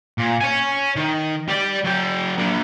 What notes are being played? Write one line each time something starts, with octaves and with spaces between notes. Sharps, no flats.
A#2
C#5 G#5
D#3
G3 D5
F#3 G5
A#3 D4